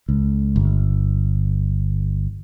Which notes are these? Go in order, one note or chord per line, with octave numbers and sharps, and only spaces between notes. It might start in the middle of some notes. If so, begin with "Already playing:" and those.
C#2
G1